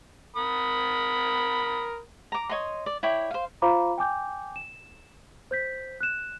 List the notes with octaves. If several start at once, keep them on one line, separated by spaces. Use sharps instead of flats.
A#4 B5 D#6
A#5 D6
C#5 D#5 A#5 C6
D5
E4 C#5 D5 G5
C5 F5
F4 C5 F5 A#5 B5 D6
G5 G#5 D6 G6
E7
C5 G6 B6
F#6 E7